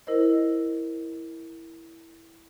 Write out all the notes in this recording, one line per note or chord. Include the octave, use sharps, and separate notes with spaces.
E4 A#4 C5 D#5